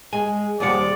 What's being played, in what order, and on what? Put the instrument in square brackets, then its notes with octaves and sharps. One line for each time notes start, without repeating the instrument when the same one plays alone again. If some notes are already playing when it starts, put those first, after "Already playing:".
[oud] G#3 [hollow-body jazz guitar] G#5
[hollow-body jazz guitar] D#2 G3 F#5 [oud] C3 F3 G#4 [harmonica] D5